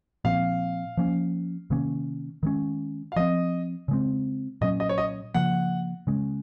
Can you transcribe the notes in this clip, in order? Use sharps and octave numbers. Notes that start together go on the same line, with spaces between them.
A#2 F3 C4 F5
F3 A#3 C#4
C3 D#3 A#3 C#4
D#3 G#3 C#4
F5
F3 C4 D#5
C#3 G#3 C4
A#2 F#3 C#4 D#5
D#5
C#5
D#5
C#3 F3 A#3 F#5
C#3 G#3 C#4